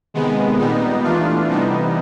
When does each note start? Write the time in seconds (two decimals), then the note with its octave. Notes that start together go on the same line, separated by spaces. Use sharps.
0.14 C3 D#3 G#3 B3
0.58 A#2 G3 B3 D#4
1.03 E3 A3 D4 F4
1.48 C3 E3 G3 B3 D#4